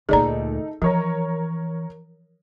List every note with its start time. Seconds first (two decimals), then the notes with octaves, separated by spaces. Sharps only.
0.09 D2 A#2 A3 D#4 G#4 D5 A#5
0.82 E3 F3 A#4 C#5 A#5